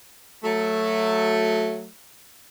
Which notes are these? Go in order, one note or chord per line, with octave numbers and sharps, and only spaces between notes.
F#3 A3